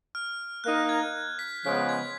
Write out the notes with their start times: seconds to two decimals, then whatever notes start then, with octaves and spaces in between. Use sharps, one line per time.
0.15 F6
0.64 A#3 D#4 A#4 F#6
0.89 G#6
1.39 B6
1.65 C#3 F3 G#3 B3 B6
1.89 G#6